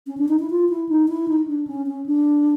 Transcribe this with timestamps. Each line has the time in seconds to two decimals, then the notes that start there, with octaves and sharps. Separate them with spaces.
0.07 C#4
0.17 D4
0.28 D#4
0.39 E4
0.50 F4
0.70 E4
0.89 D#4
1.08 E4
1.28 D#4
1.47 D4
1.67 C#4
1.86 C#4
2.06 D4